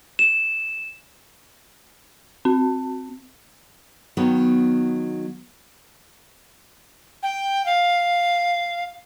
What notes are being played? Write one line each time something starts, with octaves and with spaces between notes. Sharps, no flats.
E7
C4
D#3 F#3 B3
G5
F5